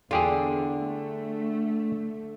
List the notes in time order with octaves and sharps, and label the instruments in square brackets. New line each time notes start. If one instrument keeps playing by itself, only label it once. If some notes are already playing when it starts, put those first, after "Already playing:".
[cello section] E2 [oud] D3 [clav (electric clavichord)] F4 G4 G#4
[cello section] A3